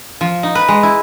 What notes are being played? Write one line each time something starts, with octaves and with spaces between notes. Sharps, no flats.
F3
D#4
B4
G#3
E4